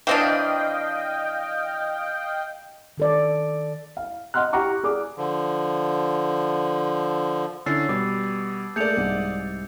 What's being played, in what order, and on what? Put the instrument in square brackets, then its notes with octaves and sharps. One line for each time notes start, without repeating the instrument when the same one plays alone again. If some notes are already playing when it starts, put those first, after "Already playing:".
[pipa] E3 C4 D4 [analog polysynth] D#5 F5 G5
[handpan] D#3 A4 D5
[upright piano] F5
D#5 F#5 C6 F6 F#6
G4 F#5 A#5 C#6 D6
G#4 D5 D6
[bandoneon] D3 F3
[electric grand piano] D3 C#4 [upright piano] E4 [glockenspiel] E6 A6 C7
[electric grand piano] B2 G3 [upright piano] B4 [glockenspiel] D6
[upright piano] A3 A#3 [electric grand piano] G#4 D5 [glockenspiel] G6 C#7 F7
[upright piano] C2 G#2